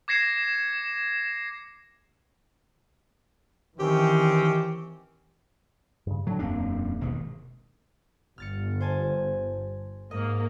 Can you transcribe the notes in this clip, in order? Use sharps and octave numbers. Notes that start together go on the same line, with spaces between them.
D6 G#6 A#6 C7 C#7 E7
D#3 E3 C4 C#4 G4
G2 C#3
A2 D3 F#3 D4
E1 F#2 A#3 C4 D4
G#1 B2 D#3
G1 F6 A6 C#7
C5 G#5 A5
G#2 A#3 D#5